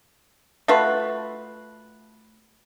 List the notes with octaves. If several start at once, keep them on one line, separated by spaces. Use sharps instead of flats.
A3 F4 F#4 B4